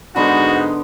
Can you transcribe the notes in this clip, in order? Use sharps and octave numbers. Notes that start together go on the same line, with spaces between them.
G#2 D3 B3 D#4 F#4 C6